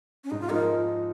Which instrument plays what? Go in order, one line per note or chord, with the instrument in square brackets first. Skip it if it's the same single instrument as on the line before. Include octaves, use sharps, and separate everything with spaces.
[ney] C#4
[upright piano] G#2 [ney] D#4
[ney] F4
[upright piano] F3 G#3 D#4 [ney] A#4